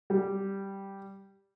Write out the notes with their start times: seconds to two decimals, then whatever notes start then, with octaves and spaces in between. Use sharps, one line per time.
0.10 G3